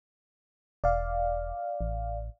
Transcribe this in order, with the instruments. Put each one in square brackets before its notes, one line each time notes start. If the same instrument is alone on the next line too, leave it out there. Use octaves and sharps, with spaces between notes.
[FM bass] E1 [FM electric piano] D5 F5
[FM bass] A1